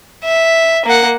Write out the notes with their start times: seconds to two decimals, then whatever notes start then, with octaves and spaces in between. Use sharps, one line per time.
0.24 E5
0.85 A#3 F#5